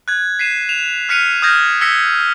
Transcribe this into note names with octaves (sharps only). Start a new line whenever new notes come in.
F#6 G#6
B6 C7 D#7 E7
E7 F7
F6 F#6 B6 C#7 D#7 F7
D#6 F6 G6 G#6 A#6
E6 G#6 A#6 B6 C#7